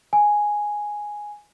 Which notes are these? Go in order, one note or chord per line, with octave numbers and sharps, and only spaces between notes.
G#5